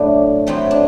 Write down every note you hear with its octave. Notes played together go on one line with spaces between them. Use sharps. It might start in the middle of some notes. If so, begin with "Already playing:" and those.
Already playing: A2 F#3 A3 D4
A2 F#3 A3 C4
D4